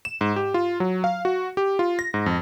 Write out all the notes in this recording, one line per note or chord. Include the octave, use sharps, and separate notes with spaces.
E7
G#2
G4
F4
F#3
F5
F#4
G4
F4
A#6
G#2
F2